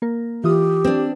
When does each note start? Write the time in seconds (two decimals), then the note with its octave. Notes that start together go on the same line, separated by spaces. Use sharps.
0.02 A#3 A#4
0.44 E3 F4 G4 D#6
0.85 C4 D4